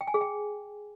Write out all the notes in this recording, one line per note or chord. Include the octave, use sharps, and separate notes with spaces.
G5
G#5
G#4
G5